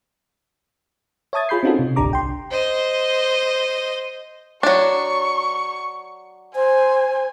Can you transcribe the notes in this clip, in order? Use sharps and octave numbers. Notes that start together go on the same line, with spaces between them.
C#5 E5 A5 D#6 G#6 A6
F4 G#4 B5 G6 C7
C4 C#4 D#4 F4 F#4 A4
C3
G#1 D2 D4 G4 A#5 D6
C2 G5 C6
C5 D#5
F#3 D4 C#6
C5 G#5